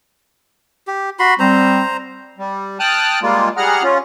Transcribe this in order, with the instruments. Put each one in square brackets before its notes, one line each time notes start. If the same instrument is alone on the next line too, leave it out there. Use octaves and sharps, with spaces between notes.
[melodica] G4
F#4 B5 C6
[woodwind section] G3 C4 [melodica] C5 A#5
[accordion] G3
G5 A5 D#6 F6 F#6
G3 G#3 A#3 F4
G3 G#4 F#5 A#5 F6
C#4 F4